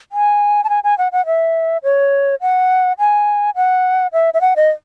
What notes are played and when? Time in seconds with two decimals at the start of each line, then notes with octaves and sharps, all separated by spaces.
0.12 G#5
0.64 A5
0.69 G#5
0.84 G#5
0.98 F#5
1.12 F#5
1.26 E5
1.84 C#5
2.41 F#5
2.99 G#5
3.56 F#5
4.13 E5
4.34 E5
4.41 F#5
4.56 D#5